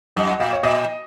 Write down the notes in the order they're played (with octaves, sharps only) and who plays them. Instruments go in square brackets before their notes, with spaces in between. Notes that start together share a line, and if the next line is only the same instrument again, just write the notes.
[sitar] F#2 [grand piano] D#5
[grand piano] F#5
[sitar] A#2 [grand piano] F5
[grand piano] C#5
[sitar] A#2 [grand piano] D#5